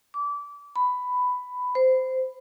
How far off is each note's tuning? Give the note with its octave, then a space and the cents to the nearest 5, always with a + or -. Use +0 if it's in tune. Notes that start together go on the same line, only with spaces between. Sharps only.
D6 -25
B5 +10
C5 -15